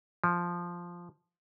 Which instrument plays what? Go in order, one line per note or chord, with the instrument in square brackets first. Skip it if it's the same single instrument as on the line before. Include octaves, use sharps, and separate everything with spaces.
[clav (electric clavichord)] F3